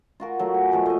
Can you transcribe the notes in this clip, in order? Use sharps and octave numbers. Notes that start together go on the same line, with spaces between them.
F4 F#4 A#4
F#3 A3
G#5
B2 F3 A3
A3 D#5